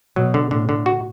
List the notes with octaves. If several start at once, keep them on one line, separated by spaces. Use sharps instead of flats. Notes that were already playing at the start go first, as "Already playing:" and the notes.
B2 F#3
D3
A2 D3
D3
F#4